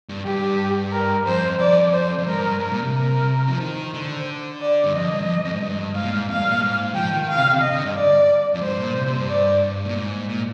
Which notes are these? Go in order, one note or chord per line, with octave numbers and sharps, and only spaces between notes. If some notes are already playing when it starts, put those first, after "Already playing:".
G2
G2 G4
A#4
F2 C5
F2 D5
C5
F2
G2 A#4
G2
A#2
C3
A#4
F3
D#3 C5
D3
D5
G2
F2 D#5
G2
F2
F2
G#2
G2
G#2 F5
A#2
G#2
F2 F5
G2
A#2
G#2
F3 G5
D#3
F5
C3
D3
C3
D#5
D3
G2
D5
F2
G2 C5
A#2
C3
C3
G2
D5
A#2
G#2
A#2